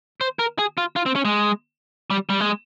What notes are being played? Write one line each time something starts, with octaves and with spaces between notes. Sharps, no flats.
C5
A#4
G#4
F4
F4
C4
C#4
G#3
G3
G3
G#3